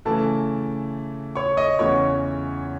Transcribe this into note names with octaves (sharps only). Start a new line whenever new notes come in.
C#3 E3 A3 A4 A5
C#5 C#6
D#5 D#6
E2 C#3 E3 C#5 C#6